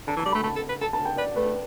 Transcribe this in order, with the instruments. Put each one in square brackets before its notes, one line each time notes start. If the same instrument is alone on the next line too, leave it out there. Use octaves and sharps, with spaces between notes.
[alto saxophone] D3 [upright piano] A5
[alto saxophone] E3
[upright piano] A5
[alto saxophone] G3
[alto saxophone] A3 [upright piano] B5
[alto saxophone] A3 [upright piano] A5
[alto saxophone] A4
B4
[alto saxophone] A4 [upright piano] A5
[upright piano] A5
G5
[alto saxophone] B4 [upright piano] D5
[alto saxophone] A3 [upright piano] B4